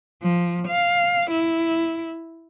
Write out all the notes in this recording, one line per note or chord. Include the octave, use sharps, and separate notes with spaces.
F3
F5
E4